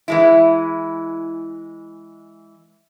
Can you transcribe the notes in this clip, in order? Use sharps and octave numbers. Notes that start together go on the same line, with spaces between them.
E3 G#3 E4